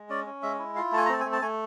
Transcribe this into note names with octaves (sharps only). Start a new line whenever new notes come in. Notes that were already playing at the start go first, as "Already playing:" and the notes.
Already playing: G#3
C#4 D5
C#4
G#3 E5
E4
F4 F5
A3 A5
G#5
A#5
C4 A5
G#5
A3
A5
A3 G#5